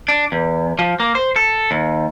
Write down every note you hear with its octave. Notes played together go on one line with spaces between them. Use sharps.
D4
E2
F3
A#3
C5
A4
D#2